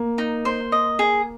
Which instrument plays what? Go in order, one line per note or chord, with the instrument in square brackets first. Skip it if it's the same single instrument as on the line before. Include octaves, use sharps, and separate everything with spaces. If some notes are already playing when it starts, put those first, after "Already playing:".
Already playing: [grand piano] A#3
[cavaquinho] D#4
C5
D#5
G#4